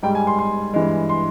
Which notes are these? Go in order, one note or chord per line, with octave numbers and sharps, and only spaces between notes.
G#2 G3 G5
G#5
C6
C6
G2 E3 G#3
C6